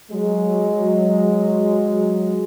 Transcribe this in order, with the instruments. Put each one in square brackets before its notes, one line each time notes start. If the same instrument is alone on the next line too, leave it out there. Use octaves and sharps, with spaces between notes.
[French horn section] F#3 G#3